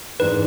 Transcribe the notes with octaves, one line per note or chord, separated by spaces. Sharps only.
G#2 E3 G#3 D4 B4